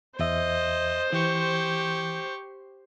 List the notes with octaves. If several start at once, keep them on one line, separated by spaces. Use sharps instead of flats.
E2 C5 D#5 E5
E3 G4 C#6